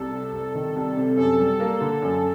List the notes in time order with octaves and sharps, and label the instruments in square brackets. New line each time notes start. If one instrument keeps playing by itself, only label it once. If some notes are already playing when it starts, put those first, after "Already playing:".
Already playing: [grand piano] C2 [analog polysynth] A4
[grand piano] C3
C2
D#3
C2
C3
[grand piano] F#2 [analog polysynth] A4
[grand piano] G3
A#3
D3
F#2